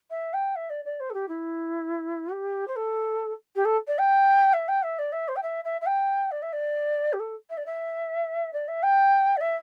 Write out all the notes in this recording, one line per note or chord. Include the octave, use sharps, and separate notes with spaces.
E5
G5
E5
D5
D5
C5
A4
G4
E4
G4
C5
A4
G4
A4
D5
G5
E5
G5
E5
D5
E5
C5
G5
E5
E5
E5
G5
D5
E5
D5
G4
A4
E5
D5
E5
D5
E5
G5
D5
E5